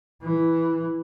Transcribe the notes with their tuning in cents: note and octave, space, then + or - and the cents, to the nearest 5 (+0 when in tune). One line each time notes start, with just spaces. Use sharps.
E3 +0